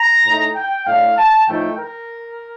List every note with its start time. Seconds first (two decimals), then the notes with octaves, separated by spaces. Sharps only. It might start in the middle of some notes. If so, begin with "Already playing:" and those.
Already playing: A#5
0.25 A2 A3 D#4
0.55 G5
0.86 A2 A3 D4 F5
1.17 A5
1.47 A2 F3 A3 D#4 G5
1.77 A#4